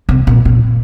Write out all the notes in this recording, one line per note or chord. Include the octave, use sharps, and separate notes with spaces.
C3
A#2
A#2